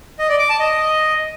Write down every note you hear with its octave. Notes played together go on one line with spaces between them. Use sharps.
D#5
D5
D6
A5
D#5